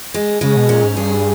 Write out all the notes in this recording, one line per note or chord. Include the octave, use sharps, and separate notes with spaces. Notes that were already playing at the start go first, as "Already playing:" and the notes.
G#3
C#3 G#3
B2
A#2 C#4
G#2
G2 G#4